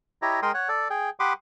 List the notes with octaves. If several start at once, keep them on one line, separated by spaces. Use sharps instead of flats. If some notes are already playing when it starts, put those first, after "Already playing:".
E4 G4 C#5 D#5 A#5
G#3 A#4 G5 C6 D#6
C#5 F#5
A4 D5
G#4 G5
G4 F#5 B5 C6 D6 D#6